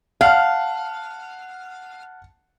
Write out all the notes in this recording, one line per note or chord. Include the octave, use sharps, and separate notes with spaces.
F5 F#5 A5 F6